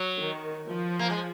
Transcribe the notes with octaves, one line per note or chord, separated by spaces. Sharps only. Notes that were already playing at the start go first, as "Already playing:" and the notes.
Already playing: F#3
D#3
F3
A#3
G#3